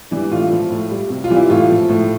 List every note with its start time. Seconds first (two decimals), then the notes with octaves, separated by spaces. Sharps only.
0.11 E3 G3 D4
0.31 A2 F4
0.52 F3
0.70 A2
0.90 G3
1.10 C3
1.24 F4
1.30 E3 G3
1.37 E4
1.50 A2 F4
1.70 F3
1.89 A2